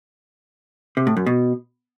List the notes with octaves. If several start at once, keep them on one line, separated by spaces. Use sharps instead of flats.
C3
A2
F#2
B2